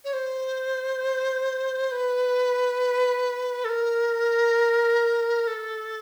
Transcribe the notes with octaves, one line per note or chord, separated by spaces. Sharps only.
C#5
C5
B4
A4
A#4
A4